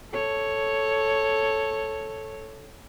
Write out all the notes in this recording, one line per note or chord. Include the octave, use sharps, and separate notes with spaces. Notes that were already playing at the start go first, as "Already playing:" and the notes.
A4 C#5